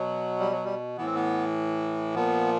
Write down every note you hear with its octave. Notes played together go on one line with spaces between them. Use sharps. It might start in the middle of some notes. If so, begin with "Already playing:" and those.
Already playing: B2 F#3
G3
F#3
G3
A2 E3 B3
C4
B3
A#2 F3 B3